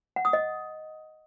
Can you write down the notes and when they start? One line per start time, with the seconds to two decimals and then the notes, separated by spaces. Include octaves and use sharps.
0.16 F#5
0.25 D#6
0.33 D#5